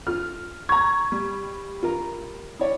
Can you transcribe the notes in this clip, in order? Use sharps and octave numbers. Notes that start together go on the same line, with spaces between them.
F4 A4 F6
A#5 C#6 G#6
G3
F4 A#4 A#5
E4 C#5 D5